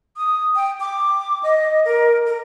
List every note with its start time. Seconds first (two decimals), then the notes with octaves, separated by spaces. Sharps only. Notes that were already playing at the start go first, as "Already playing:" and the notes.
0.17 D#6
0.56 G5
0.80 D6
1.43 D#5
1.85 A#4
2.26 A#4